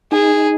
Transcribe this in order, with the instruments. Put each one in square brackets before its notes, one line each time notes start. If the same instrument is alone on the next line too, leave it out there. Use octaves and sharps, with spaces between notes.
[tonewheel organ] D#4 [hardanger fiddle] G#4